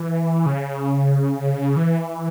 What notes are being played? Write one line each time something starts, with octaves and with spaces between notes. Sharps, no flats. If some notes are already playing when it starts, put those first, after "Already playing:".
Already playing: E3
C#3
E3